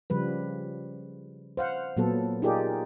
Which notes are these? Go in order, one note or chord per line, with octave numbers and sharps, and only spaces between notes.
C#3 F3 G3 B4
C5 F5 F#5
A#2 F#3 B3 A4
D#4 F4 G4 G#4 A#4 D5